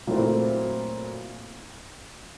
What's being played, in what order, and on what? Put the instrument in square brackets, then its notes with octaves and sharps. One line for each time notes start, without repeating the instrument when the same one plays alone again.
[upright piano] A#2 F#3 A3 C4 E4